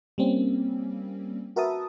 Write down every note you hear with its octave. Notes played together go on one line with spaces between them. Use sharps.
G3 A#3 C4 C#4
F#4 A#4 B4 E5 A5 D#6